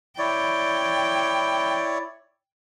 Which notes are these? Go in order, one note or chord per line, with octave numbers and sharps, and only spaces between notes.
E4 C#5 D5 G5